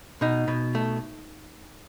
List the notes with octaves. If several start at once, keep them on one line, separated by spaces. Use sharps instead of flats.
B2 D#4
B2
A3